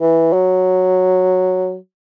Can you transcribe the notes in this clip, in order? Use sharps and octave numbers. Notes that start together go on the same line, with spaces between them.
E3
F#3